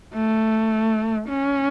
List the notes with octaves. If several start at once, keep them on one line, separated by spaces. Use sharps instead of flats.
A3
C#4